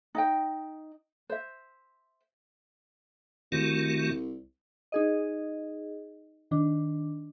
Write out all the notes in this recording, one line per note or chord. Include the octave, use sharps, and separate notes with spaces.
D#4 D#5 G5
C5 E5
C2 D#3 A3 F#4
D#4 G#4 D#5
D#3 D4